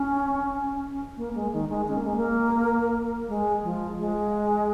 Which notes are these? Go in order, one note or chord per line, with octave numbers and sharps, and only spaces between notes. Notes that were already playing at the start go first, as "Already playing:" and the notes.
Already playing: C#4
A#3
G#3
D#3
G#3
C#4
A#3
G#3
A#3
G#3
F3
G#3